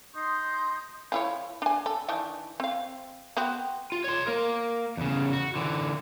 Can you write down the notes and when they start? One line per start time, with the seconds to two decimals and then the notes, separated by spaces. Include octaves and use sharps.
0.14 D#4 C6 D#6 G6
1.12 F3 E4 C#5
1.62 D4 G#5
1.86 A4
2.08 D#3 E3 D4
2.60 C4 F5
3.37 B3 C4 F#4
3.92 F4
4.04 C#5 C6
4.27 A#3 A#4
4.97 E2 C#3
5.33 F#4
5.56 D3 E3